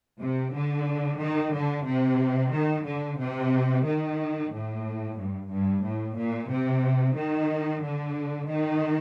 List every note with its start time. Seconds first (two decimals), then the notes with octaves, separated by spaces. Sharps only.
0.19 C3
0.52 D3
1.18 D#3
1.51 D3
1.84 C3
2.51 D#3
2.84 D3
3.17 C3
3.83 D#3
4.49 A2
5.16 G2
5.49 G2
5.82 A2
6.15 A#2
6.48 C3
7.14 D#3
7.81 D3
8.47 D#3